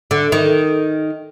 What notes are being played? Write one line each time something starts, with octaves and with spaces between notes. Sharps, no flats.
D3
D#3